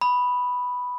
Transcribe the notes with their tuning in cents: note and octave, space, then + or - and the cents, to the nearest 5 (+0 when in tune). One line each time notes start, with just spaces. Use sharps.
B5 +0 D#6 +0